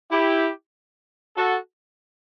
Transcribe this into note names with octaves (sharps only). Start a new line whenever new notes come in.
E4 G4
F#4 A4